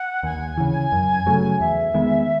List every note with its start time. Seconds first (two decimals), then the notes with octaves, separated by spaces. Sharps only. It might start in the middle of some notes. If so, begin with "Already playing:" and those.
Already playing: F#5
0.23 D#2 G#5
0.57 C#3 E3
0.92 F#2
1.26 C#3 F#3 A3
1.60 E2 E5
1.94 D#3 G#3 B3